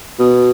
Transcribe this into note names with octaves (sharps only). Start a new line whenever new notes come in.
B2